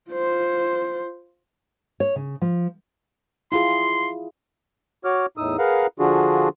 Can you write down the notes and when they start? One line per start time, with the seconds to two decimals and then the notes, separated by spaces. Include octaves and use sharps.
0.11 F4 C5
2.00 C#5
2.16 C#3
2.42 F3
3.52 E4 F4 G#4 C6
5.05 F#4 C#5 D6 F6
5.37 E2 A2 D#4 D#6 E6
5.59 G#4 A#4 B4 F5 F#5 A#5
5.99 D3 F3 D4 F4 F#4 G#4